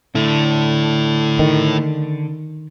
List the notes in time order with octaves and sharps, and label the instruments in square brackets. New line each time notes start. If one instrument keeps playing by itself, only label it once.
[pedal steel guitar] D3 [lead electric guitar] A3 E4
[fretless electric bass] D#3